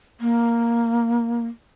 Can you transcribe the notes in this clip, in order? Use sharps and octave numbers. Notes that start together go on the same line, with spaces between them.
A#3